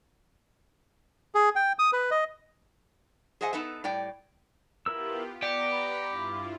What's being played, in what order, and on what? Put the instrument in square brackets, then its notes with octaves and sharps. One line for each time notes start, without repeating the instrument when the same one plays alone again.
[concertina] G#4
G5
D#6
B4
D#5
[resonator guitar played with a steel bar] G#4 C5 D#5 E5 F#5 G#5
B3 D#4 A4 B4 E5
A2 G3 D5 G5
[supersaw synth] B3 F4 G4 [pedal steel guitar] E4 A#4 E6
[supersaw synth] B3 A#5 [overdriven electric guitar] G4 [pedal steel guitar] D5 F#5 G5
[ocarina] B5
[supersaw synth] G2 E4 F4